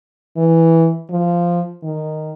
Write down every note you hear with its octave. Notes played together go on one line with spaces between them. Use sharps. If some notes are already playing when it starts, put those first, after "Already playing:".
E3
F3
D#3